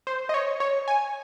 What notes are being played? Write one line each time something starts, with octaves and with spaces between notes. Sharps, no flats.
C5
D#5
C#5
C#5
G#5